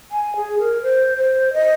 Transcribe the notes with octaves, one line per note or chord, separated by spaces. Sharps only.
G#5
G#4
A#4
C5
C5
D#5